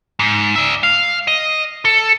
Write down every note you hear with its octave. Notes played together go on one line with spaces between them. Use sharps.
G#2
D5 E5
F5
D#5
A4